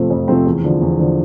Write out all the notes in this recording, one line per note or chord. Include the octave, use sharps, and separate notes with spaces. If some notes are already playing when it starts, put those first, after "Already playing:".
Already playing: F2 C3 F3 A3 C4
F2
C3 F3 A3 C4
E2
D3 F3
E2
D3 F3